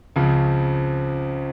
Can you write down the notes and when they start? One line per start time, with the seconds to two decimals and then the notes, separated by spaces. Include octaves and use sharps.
0.16 C#2 C#3 F3 C4